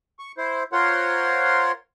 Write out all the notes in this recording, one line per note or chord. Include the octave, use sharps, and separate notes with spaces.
C#6
E4 C5
F4 A#4 C5 C#5 F#5 C6